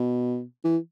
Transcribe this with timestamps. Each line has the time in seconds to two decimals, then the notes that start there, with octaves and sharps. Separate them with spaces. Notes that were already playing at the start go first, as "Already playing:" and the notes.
Already playing: B2
0.64 E3